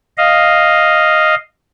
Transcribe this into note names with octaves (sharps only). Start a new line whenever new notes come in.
D#5 F5